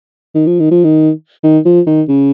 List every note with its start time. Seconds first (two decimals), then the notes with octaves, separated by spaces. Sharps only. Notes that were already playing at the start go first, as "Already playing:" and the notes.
0.35 D#3
0.47 F3
0.60 D#3
0.71 F3
0.84 D#3
1.43 D#3
1.65 F3
1.87 D#3
2.08 C#3